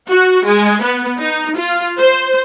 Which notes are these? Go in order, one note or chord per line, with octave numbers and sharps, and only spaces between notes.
F#4
G#3
B3
D#4
F4
C5